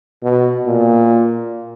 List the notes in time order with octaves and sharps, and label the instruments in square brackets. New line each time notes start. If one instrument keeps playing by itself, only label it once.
[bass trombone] B2
A#2